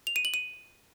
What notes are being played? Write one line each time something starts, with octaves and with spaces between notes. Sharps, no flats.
F7
D#7
F#7
D#7